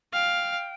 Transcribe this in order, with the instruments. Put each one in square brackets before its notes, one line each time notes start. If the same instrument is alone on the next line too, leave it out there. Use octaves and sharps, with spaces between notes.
[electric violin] F5 [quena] G5